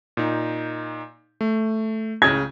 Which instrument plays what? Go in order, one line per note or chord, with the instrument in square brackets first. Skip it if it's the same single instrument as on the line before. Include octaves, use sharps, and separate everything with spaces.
[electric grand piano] A#2 D#4
A3
[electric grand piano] C#2 C#3 [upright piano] G#6